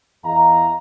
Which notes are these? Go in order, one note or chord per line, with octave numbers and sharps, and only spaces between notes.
E2 E4 D#5 F5 A#5